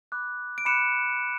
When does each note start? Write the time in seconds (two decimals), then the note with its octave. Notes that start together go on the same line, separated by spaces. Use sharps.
0.12 B5 D6 F#6
0.58 D7
0.65 B5 D6 F#6 C#7 E7